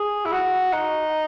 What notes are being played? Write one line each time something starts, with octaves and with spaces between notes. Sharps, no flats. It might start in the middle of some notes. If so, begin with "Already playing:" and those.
Already playing: G#4
E4
F#4
D#4